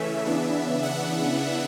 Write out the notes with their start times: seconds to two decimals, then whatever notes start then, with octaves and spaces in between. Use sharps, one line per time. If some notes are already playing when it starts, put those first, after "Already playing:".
Already playing: C#3 E3 A3 C#4 E5
0.26 C#3 E3 B3 D4
0.83 F#5